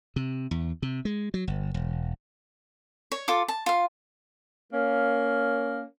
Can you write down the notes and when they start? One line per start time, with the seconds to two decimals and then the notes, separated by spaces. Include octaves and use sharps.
0.16 C3
0.51 E2
0.82 C3
1.05 G#3
1.34 F#3
1.47 G1
1.74 E1
3.12 C#5
3.28 F4 A4 D6
3.48 A5
3.66 F4 F5
4.73 A#3 C#4